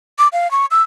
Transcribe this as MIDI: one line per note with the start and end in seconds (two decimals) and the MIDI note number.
0.19 0.28 86
0.33 0.50 77
0.51 0.66 85
0.71 0.82 88